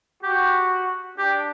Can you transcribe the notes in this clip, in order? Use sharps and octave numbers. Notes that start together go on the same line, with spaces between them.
F#4 G4
D4 G4